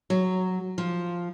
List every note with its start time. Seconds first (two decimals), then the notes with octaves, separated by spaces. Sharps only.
0.10 F#3
0.78 F3